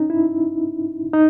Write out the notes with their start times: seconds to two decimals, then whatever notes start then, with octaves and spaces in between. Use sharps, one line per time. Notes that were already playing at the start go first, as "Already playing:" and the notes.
Already playing: C#4 D#4
0.10 E4
1.13 D#4